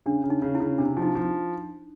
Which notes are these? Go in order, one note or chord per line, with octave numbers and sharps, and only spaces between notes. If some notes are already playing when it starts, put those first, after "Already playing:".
C#3 D4
C#3
D#4
C#3
E4
C#3
C3 D4
F3
D#4
F3